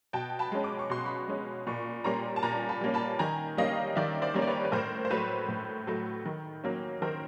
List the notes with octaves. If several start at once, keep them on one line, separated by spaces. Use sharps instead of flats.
B2 G5 A5
A5 B5
G#3 C#4
D6
C#6
B2 C6
B5 C#6
G#3 C#4
A#2 B5 C#6
G3 A#3 C#4 A#5 C6
A5
A#2 G#5 A#5
A5 B5
G3 A#3 C#4
A5 B5
D#3 G#5 A#5
G3 A#3 C#4 D#5 F5
D#3 D5 E5
C5 D5
G3 A#3 C#4
D5
B4 C#5
B4
A2 A#4 C5
C5
F#3 A3 B4 C#5
A2
F#3 A3
D#3
F#3 A#3 C#4
D#3 A#4 C5